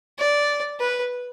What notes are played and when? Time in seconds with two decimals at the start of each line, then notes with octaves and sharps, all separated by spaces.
0.18 D5
0.80 B4